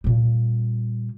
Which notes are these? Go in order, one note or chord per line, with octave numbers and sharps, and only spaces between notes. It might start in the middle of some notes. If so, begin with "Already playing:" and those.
A#2 G3